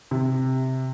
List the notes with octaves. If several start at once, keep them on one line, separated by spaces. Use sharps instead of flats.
C3